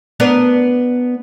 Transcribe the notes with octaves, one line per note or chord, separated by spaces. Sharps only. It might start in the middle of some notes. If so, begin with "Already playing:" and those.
B3 D4 A#4